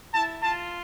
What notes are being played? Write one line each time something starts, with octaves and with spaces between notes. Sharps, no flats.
E4 A5
F4 A5